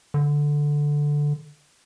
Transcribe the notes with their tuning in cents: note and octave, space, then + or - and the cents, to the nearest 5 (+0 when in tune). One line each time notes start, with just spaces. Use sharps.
D3 +0